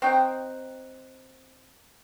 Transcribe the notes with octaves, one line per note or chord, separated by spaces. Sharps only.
C4 D#4 F#4 G5